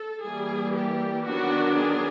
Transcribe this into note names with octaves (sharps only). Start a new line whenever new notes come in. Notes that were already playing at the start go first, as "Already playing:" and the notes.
Already playing: A4
E3 G3 A#3 G#4
G4
D#3 F#3 B3 D4 F#4
G#4